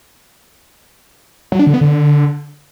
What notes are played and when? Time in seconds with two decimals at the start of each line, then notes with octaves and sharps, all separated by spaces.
1.52 F#3
1.59 D4
1.67 D3
1.74 B3
1.81 D3